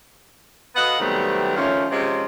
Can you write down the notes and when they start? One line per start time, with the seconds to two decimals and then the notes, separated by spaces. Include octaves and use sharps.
0.76 B3 F#4 A4 D#5 F5 F#5
1.00 C3 D#3 F#3 G3 A3 B3
1.56 D#3 F3 A3 C#4
1.91 C3 F3 G#3 C#4